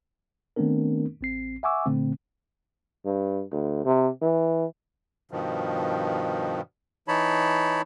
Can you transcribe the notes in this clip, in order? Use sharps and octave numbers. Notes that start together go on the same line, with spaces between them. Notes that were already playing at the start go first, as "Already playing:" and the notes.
D#3 A3 B3 C4 D4 A#4
A1 C4 C7
E5 F#5 G#5 C#6 D6 E6
A#2 D3 A3 C4
G2
D2
C3
E3
G2 B2 D#3 F3
E3 D#4 C#5 A5 B5